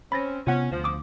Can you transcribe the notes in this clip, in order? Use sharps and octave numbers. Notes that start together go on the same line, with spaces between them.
C4 C#4 B5 A6 A#6
C3 B3 C#4 F4 F#5
D2 F3
D6 D#6